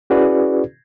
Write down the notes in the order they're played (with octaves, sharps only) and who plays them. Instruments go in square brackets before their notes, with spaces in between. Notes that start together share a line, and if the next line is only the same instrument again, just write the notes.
[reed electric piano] C#4 E4 F#4 G#4 B4 D5